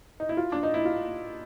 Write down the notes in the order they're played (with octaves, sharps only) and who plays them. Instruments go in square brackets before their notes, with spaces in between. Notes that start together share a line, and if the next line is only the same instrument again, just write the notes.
[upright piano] D#4
E4
F4
D4
D#4
E4
F4